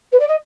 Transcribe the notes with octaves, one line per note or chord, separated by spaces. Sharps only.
B4
D5
D#5